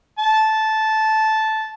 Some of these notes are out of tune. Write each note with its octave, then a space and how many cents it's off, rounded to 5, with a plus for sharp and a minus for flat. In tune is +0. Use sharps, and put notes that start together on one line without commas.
A5 -10